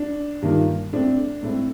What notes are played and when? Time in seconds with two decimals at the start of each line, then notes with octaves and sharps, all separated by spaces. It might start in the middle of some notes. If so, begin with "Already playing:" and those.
Already playing: D4
0.42 G2 D#3 A#3 F4
0.92 A2 A3 C4 D4
1.43 A2 A3 C4